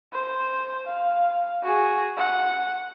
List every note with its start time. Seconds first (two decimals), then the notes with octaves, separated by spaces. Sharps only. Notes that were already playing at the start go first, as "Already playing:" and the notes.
0.13 C5
0.87 F5
1.63 F#4 G#4
2.17 F#5